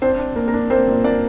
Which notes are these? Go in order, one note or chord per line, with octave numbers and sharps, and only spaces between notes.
C4 D4 C5
D4
A#3
A#4
D4
A#3 C4 C5
A#2
A#3 D4 D5